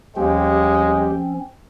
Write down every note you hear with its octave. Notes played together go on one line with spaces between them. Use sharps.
D#2 F3 G3 G#3 C4 C#4 G4